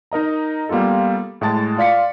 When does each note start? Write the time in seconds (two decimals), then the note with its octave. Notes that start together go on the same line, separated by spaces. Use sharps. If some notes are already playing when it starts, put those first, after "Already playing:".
0.12 D#4 A#4 D#5 A#5
0.69 G3 A#3 B3 F4 A4
1.41 A2 G#3 A5 A6
1.77 F4 D5 F5 B6 C#7